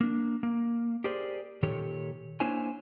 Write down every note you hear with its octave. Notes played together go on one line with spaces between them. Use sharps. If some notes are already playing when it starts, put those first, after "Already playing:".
A#3 D4
A#3
G4 G#4 A#4 C5 D5
A#2 D#3 G4 A4 C#5
A#3 D4 E4 C5 C#5 G#5